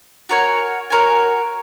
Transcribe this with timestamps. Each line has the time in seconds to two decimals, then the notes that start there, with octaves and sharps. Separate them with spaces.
0.29 F#4 A#4 C#5 G#5
0.90 F#4 A#4 C#5 G#5